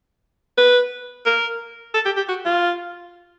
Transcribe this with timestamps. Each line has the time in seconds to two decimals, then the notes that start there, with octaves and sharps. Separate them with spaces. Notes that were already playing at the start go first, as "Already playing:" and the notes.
0.58 B4
1.26 A#4
1.94 A4
2.05 G4
2.17 G4
2.28 F#4
2.45 F4